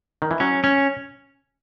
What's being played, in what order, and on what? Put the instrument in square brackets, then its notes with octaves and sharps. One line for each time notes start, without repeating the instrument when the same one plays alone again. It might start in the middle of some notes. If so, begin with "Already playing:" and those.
[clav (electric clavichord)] D#3
E3
[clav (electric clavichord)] F#3 [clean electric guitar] C#4
[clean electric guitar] C#4